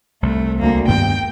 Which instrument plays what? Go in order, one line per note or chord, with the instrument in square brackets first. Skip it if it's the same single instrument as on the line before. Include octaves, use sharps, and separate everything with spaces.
[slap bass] C2 [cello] A3
[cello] D2 A#3
[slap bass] G2 D#3 B3 [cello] G5